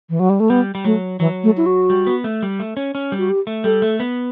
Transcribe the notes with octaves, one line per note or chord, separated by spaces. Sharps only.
E3
F#3
G3
A3
G3 B3
G3
F#3 A3
E3 F#3
A3
E4
F#4
G3
B3
A3
G3
A3
C#4
C#4
G3
F#4
G4
A3
G3 A4
A3
B3